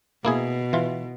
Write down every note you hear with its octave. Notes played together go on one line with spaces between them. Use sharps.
B2 A#3 E4 G#4
E3 F4